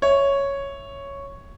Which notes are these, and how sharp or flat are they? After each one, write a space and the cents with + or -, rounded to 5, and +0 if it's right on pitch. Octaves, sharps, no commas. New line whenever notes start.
C#5 +0 E5 +0